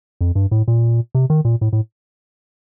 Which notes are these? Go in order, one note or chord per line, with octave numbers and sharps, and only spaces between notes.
F2
G2
A2
A#2
C3
D#3
A#2
A2
A2